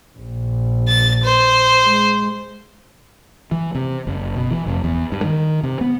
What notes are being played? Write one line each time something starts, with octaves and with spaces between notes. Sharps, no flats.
A#1
A6
C5
G#3
E3
C3
F#1
B2
E3
F1
E2
G2
D#3
C3
B3